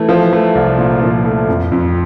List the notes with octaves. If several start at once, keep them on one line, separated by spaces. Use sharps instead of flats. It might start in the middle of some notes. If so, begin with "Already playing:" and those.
Already playing: E3 A3
F3
A3
C2
A#2
F3
A3
F2
F2